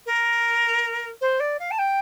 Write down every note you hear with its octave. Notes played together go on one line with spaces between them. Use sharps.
A#4
C5
D5
F5
A5
G5